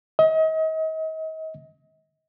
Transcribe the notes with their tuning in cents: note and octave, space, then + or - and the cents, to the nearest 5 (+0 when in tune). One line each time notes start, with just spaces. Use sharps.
D#5 +35